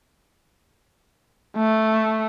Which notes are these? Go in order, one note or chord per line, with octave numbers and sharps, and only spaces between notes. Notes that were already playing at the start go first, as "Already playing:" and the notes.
A3